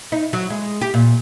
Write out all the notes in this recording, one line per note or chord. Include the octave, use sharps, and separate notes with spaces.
D#4
F#3
G#3
G4
A#2